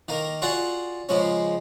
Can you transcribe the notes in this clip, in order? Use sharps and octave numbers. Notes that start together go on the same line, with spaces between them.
D#3 A#3 A#4
F4 F#4 G#4 D5 F#5
C#3 F3 G#3 C#4